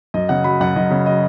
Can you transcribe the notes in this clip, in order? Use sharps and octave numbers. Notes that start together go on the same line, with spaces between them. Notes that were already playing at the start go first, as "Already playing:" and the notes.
F#2 D#5
C#3 F#5
F#3 B5
F#2 F#5
F#2 D#5
C#3
F#3 D#5